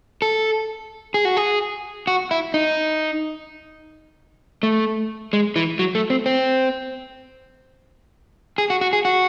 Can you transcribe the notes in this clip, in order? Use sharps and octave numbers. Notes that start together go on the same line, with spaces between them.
A4
G#4
F#4
G#4
F#4
E4
D#4
A3
G#3
E3
F#3
A3
C4
C4
G#4
F#4
F#4
G#4
F#4